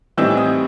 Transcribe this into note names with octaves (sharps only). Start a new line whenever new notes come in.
A2 E3 G3 C4 D#4 E6
D#6